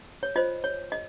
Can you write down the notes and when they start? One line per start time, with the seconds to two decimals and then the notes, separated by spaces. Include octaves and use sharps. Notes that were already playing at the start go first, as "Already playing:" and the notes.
0.23 C#5
0.36 F4 C5 D#5
0.64 C#5
0.92 D#5